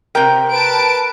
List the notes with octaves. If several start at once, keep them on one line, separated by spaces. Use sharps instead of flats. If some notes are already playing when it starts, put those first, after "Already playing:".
C3 A#4 G5
B4 A5 D7